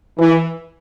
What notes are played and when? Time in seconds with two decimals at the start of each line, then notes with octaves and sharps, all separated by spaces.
0.17 E3